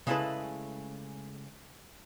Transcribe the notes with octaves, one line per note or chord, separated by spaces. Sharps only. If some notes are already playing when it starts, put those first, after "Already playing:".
C#3 G#3 A3 E4 A4 B4